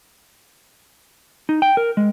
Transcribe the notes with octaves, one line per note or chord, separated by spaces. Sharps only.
D#4
G5
A#4
G#3